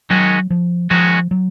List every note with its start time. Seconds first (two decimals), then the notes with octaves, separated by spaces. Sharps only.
0.10 D#3 F#3 G#3 C#4 F#4
0.50 F3
0.90 D#3 F3 G#3 C#4 F#4
1.31 F#3